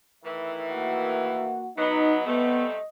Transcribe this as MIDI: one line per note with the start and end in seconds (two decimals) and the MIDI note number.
0.24 1.62 45
0.24 1.62 51
0.24 1.62 52
0.24 1.54 76
0.71 1.69 58
0.71 1.69 66
0.71 1.69 78
1.78 2.23 54
1.78 2.23 59
1.78 2.15 63
1.78 2.22 75
2.26 2.76 48
2.26 2.76 55
2.26 2.76 57
2.26 2.65 59
2.26 2.88 75